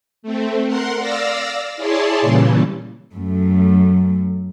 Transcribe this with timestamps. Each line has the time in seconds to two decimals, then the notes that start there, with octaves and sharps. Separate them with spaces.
0.22 A3 C4
0.66 A#4 F#5 C6
0.99 D5 F5 E6 A#6
1.76 E4 G#4 C#5 D5 A5 C6
2.21 A#2 C#3 E3 G3
3.13 F#2 A3